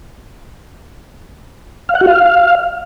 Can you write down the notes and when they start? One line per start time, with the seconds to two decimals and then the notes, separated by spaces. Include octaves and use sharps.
1.89 F5
1.95 F#5
2.01 F#4
2.07 F5